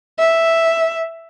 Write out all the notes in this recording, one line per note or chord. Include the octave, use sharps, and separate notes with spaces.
E5